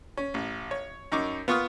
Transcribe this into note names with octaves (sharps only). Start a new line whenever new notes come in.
C#4
A1
C#5
F#2 D#4 C#6 D6
B3 F4 C#6 D#6 F6